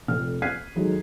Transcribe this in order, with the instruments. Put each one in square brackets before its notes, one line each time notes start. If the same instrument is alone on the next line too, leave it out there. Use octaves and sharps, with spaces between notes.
[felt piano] F1 F2 F6
F6 F#6 G#6 B6 C7 D#7
D#3 F#3 G#3 A3 D#4